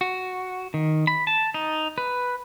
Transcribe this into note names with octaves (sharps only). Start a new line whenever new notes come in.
F#4
D#3
B5
A5
D#4
B4